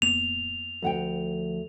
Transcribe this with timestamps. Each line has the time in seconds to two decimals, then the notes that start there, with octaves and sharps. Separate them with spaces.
0.02 D1 F2 A#3 B3 F7
0.82 D2 F3 F#5 G5